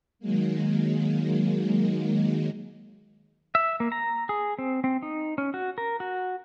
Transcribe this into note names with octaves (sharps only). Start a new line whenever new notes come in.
D#3 F#3 G#3 A#3
E5
A#3
A#5
G#4
C4
C4
D#4
C#4
F#4
A#4
F#4